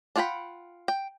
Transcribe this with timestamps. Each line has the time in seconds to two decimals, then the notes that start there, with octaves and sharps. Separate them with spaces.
0.16 D4 F4 F#5 G5 B5
0.88 G5